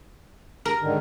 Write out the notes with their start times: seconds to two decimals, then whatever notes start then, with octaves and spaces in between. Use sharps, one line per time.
0.65 A#4
0.81 G#2 D3 D#3